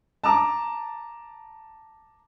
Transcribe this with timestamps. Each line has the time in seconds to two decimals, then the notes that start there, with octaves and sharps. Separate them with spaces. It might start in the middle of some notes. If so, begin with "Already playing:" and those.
0.24 A5 A#5 D6